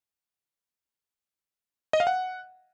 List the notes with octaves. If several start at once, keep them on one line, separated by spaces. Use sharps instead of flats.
D#5
F5
F#5